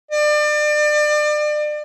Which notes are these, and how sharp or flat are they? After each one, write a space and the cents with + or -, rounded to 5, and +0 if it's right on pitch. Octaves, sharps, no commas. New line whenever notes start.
D5 +35